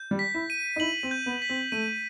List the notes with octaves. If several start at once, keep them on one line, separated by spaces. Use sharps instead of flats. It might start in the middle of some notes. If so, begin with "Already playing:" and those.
Already playing: G6
G3
B6
E4
D#7
D#4
E4 F#7
C4
G6
B3
B6
C4
A3 D#7